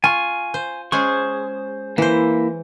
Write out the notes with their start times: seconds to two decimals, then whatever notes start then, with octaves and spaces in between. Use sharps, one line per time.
0.04 F4 G#5 C#6
0.54 C5
0.92 G#3 C#4 G#4 C5 C#6
1.98 E3 A#3 E4 C5